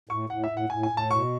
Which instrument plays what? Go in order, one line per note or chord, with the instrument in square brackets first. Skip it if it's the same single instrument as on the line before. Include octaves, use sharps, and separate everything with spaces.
[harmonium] A2 [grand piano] C#6
[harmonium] A2 [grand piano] F#5
[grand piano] E5
[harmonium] A2
[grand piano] F#5
[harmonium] A2 [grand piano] G#5
[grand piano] G#5
[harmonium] A2
[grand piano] A5
[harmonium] B2 [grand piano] C#6